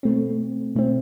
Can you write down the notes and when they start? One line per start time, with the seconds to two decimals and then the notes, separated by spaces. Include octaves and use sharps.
0.03 B2 A3 C4
0.75 B2 A3 C4